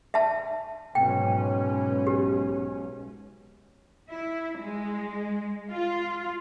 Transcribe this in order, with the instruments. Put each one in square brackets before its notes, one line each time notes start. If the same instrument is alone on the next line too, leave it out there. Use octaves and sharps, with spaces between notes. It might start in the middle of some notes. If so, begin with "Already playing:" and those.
[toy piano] E5 A5
[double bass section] B1 G#2 C#4 [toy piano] G5
[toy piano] G4
[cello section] E4
G#3
F4